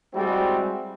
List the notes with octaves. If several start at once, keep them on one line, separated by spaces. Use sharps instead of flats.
G3 G#3 C4 E4 F#4